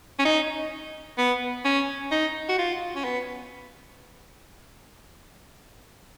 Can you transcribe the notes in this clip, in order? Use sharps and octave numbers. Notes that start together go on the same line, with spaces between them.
C#4
D#4
B3
C#4
D#4
F#4
F4
C#4
B3